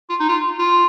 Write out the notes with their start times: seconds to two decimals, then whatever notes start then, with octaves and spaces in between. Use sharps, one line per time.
0.10 F4
0.20 D#4
0.29 F4
0.59 F4